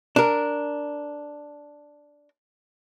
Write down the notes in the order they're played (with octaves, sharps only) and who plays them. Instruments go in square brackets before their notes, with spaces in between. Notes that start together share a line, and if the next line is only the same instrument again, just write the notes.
[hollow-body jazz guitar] D4 A#4